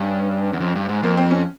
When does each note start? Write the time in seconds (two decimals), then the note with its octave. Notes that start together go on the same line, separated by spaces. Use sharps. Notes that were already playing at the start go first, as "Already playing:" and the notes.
Already playing: G2 C#4
0.53 E2
0.60 F2
0.75 G2
0.89 G#2
1.03 F2 A#3
1.17 C4
1.31 C#4